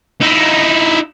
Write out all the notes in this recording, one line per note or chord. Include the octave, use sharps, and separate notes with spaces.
D#4 E4